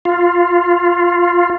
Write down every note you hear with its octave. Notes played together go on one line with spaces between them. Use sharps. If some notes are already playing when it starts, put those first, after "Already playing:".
F4